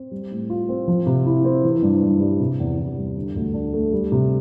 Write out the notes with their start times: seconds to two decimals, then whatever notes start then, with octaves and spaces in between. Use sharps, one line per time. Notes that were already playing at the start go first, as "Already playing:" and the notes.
Already playing: C4
0.11 G3
0.31 A2
0.50 F4
0.69 C4
0.88 F3
1.06 C3
1.26 E4
1.45 C4
1.64 E3
1.82 G2
2.03 G2
2.21 G3
2.40 C3
2.59 E2
2.79 E2
2.97 G3
3.16 D3
3.36 D2
3.54 D4
3.73 A3
3.92 G3
4.12 C3